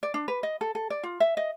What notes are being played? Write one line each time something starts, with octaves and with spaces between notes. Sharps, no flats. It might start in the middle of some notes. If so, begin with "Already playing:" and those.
D5
D4
B4
D#5
A4
A4
D5
F4
E5
D#5